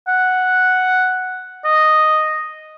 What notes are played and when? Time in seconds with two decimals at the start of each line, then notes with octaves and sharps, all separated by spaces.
0.08 F#5
1.65 D#5